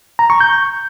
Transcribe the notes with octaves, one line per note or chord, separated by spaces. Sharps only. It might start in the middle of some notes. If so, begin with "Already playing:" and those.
A#5
C#6
G6